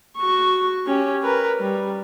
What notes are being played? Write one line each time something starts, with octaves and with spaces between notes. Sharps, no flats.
F#4 C#6
C#4 G4
A#4 B4
G3